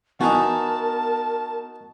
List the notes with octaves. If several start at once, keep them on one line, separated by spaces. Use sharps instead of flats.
B3 D#4 E4 F#4 A#4 G#5 A5